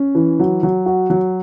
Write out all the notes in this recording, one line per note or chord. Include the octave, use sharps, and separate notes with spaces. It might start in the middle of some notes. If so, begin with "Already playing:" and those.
Already playing: C#4
E3
F#3
F#3
F#4
F#3